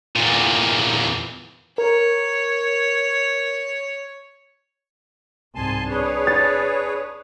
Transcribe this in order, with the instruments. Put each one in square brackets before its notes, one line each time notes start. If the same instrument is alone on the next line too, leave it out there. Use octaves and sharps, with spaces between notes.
[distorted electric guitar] E2 A#2
[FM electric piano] A#4 [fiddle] C#5
[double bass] C2 G#2 [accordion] G#5 A5 C6
[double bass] D4 [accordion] G#4 B4 C#5
[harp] A6